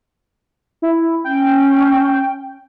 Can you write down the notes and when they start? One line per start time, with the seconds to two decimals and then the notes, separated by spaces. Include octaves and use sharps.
0.82 E4
1.24 C#4 G5